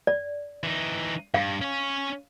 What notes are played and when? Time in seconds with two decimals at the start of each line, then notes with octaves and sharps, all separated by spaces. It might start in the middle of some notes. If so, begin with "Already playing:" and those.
0.07 D5
0.63 E3 D#4
1.34 G2 F5
1.62 C#4 C#5